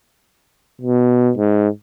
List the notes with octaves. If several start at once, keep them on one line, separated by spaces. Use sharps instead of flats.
B2
G#2